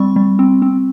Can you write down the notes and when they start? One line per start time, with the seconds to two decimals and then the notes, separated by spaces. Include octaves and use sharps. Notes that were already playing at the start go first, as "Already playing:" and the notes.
Already playing: G3 C4 C#6
0.16 G3
0.39 C4
0.62 C4